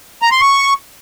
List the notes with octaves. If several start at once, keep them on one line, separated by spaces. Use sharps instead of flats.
A#5
C6
C#6